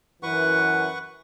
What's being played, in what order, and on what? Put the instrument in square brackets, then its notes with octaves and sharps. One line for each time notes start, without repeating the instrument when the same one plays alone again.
[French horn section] F#2 E3 [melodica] B4 F#5 C#6